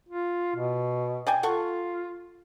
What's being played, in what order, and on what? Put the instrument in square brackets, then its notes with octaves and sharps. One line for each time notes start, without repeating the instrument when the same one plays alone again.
[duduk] F4
B2
[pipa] D5 G5 G#5
[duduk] F4 [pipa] A4 F#5 C#6